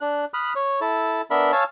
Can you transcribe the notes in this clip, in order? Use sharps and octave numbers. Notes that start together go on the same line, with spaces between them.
D4 F#6
B5 D#6 F6 F#6
C#5
E4 A4 A5
B3 D4 A#4 E5 B5
C#5 F5 G#5 A5 E6 F6